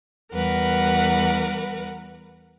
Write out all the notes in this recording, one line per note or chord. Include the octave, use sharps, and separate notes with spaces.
E2 G3 A#4 B4 F#5